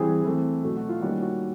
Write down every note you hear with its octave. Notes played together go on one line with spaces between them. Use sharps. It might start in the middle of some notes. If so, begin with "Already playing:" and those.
Already playing: E3 G3 C4 G#4
E3 A3 C4
B2 F#3 A3
F#4
F4
D#3 G3 A#3 C#4 F#4
F#4